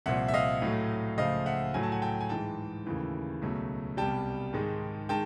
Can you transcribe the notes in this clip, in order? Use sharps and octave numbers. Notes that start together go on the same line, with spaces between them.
C2 A#2 F3 E5 F#5
E5
D#5 F5
A2 F#3 A3
C#2 C#3 F3 A3 D#5 F5
E5 F#5
A2 F#3 A3 G#5
A5
F#5 G#5
G5 A5
G#5
G#2 E3 G#3 G5 A5
D#2 C#3 E3 A3
C#2 B2 F#3 A3
C2 B2 G3 G5 A5
G#2 D#3 G#3
D#3 G#3 G5 A5